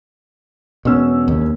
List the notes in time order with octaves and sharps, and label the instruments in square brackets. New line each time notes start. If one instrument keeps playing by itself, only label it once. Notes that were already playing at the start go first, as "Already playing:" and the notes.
[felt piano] E1 C#4 E6 [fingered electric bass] B2
[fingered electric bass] D#2